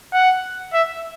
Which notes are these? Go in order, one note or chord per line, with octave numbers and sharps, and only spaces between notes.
F#5
E5